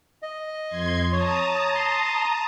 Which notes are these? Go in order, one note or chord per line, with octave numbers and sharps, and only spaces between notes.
D#5
F2 C6 G#6
C#5 A5 A#5 D#6
C6